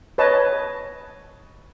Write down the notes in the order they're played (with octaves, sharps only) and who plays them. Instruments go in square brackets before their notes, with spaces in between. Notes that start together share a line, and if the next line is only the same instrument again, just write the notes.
[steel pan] B4 C#5 D#5 A5